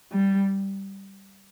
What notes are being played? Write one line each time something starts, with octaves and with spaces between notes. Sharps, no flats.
G3